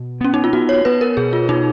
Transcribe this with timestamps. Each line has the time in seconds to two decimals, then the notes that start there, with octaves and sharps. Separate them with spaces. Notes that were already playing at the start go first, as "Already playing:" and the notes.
Already playing: B2
0.21 B3 C#4
0.34 D#4
0.44 F4
0.53 B3 F#4
0.69 C#5
0.85 B3 B4
1.01 A#4
1.17 B2 G#4
1.33 F4
1.49 B2 D#4